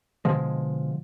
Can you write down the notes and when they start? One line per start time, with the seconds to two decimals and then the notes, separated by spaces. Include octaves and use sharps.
0.25 B2 D3 F3 G#3